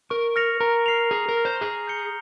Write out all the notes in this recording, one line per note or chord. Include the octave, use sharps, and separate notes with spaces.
A#4 C#6
F6 A#6 C#7 F7
A#4 A#5
F6 C7 F7
G#4 A#5
A#4
F6 A#6
C5
G#4 D#6
G6 A#6 C#7 G7